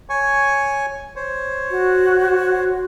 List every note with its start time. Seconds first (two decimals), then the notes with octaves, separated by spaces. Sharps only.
0.10 C#5 G#5 C#6
1.16 C5 C#5
1.71 F#4